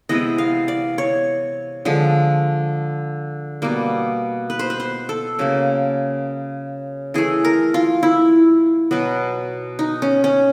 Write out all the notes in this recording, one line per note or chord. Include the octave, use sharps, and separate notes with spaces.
C3 E3 G#3 B3 D#5
F5
D5
C#5
D3 F3 G#3
B2 G3 A#3
B4
C5
B4
C5
A4
C#3 F#3 A#3
E3 A3 G#4
A#4
F4
E4
B2 F#3 B3
D#4
C#4
C#4